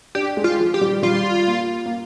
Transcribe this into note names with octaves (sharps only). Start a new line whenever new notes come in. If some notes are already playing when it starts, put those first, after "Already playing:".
D4 G4
G#3
F4
F3
G4
G3
G3 F4
A#3
A#3